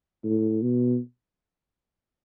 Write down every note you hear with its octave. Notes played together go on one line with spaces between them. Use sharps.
A2
B2